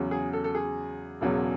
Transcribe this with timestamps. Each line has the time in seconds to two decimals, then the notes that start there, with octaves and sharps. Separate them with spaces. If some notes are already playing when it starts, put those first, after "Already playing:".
Already playing: E2 C#3 F#3
0.11 G#4
0.33 A4
0.44 A4
0.55 G#4
1.21 E1 E2 C#3 F#3